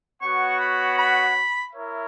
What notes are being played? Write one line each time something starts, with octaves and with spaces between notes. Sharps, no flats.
B3 F#4 C#5 F#5 C#6
B5
B5
E4 A#4 C#5 E5